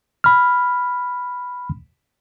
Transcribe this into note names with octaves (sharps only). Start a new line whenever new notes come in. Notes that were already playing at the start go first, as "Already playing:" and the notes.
B5 F6